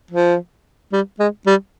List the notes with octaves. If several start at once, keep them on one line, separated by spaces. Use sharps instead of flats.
F3
G3
G#3
G3